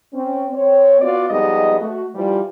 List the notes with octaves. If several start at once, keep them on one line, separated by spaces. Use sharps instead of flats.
C4 C#4
C4 C#5
B3 F4 F#4 D5
F2 G3 G#3 B3 D#4 D#5
A3 F#4
E3 F3 G3